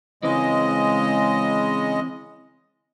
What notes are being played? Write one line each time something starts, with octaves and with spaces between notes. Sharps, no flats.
C#3 E3 G#3 C4 D#5